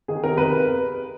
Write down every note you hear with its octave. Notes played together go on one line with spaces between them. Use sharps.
D#3 G#4
C3 A#4
F2 B4